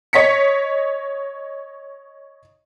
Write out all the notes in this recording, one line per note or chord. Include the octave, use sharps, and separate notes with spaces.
C#5 D#5 B6 C#7